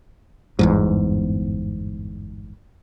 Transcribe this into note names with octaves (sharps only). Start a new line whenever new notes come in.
G1 E2 G#2